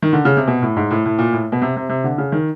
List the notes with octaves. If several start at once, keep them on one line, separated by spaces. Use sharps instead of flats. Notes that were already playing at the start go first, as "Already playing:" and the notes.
D#3
D3
C#3
C3
B2
A2
G#2
A2
A2
A#2
A2
B2
C3
C3
C3
D3
C#3
D#3